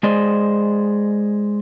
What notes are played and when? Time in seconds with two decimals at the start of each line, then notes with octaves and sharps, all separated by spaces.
0.03 G#3 G#4 C5 D5 D#5